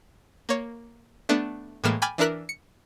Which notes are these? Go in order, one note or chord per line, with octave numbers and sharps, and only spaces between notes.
A#3 C#5
A3 B3 D4
A2 E3 G#3 A#3 F6 E7
G5 G#5 B5 D6 F6 A6
E3 D4 E4 A#4 F#6 B6
C#7